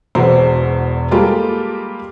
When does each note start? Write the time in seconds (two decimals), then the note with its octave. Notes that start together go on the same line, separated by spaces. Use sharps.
0.15 E1 E2 F#4 C5
1.11 G3 G#3 A#3 F4 G4 A4